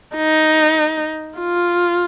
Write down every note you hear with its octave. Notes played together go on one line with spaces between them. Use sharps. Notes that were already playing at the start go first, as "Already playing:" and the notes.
D#4
F4